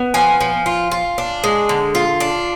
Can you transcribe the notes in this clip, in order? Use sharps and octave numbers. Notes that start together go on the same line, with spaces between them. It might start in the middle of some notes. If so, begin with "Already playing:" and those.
Already playing: B3
F3 G#5
F3
F4
F4
D4
G#3
D3
F4
D4